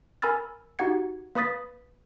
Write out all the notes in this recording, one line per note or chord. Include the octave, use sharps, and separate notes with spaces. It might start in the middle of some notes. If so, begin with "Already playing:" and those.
A#4 G#5 B5 E6 F6 A6
D#4 F#4 G4 F#5 G#6 C#7
A#3 B4 B5 D#6 A6 B6